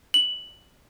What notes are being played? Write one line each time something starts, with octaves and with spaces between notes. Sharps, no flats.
F#7